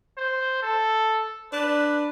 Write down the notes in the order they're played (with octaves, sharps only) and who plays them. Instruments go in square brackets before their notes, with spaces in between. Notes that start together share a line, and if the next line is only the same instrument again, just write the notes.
[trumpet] C5
A4
[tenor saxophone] D4 [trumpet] B4